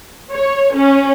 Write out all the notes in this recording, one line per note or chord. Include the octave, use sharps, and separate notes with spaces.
C#5
C#4